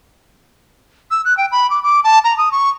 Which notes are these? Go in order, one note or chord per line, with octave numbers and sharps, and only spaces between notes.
E6
F#6
G5
B5
D6
D6
A5
A#5
D#6
C#6